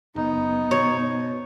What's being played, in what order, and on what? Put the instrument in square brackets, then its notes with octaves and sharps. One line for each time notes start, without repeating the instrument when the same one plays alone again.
[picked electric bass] F#1 [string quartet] B3 [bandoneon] D#4
[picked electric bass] B2 [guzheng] C#5